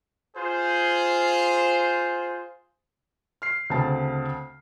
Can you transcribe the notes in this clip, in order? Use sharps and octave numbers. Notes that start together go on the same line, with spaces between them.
F4 G#4 C5
F6 C7
D2 C#3 C4 A5